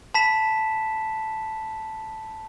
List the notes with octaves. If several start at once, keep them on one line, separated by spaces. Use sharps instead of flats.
A5 B5 B6 E7